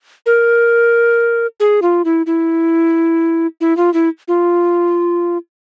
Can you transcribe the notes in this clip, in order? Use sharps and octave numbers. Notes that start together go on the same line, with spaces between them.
A#4
G#4
F4
E4
E4
E4
F4
E4
F4